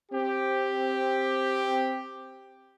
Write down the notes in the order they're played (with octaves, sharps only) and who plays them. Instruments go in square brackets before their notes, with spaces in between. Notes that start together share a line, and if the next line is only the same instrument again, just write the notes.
[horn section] C4 G4